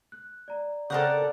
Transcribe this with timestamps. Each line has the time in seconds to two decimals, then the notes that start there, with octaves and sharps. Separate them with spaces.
0.12 F#6
0.48 D5 A#5
0.90 C#3 C4 A4 A#4 D5 F#5 G6